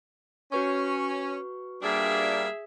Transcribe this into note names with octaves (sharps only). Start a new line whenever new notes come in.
C#4 F#4 B4 C#6
G3 A#3 D4 G#4 E5